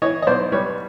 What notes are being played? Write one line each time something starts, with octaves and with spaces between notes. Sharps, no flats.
E3 C#5 D#5
D#5
B1 C5 D5
G3 B4 C#5